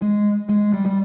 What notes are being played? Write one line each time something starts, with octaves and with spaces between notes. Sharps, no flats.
G#3
G#3
G3
G3